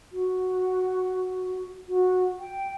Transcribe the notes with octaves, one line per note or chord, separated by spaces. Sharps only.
F#4
F#4
G5